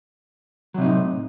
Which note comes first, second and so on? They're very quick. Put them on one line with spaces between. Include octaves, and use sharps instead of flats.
F#3 C3 D#4 A2